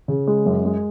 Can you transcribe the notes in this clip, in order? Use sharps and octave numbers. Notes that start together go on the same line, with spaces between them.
C#3
G#3
F#2
G#3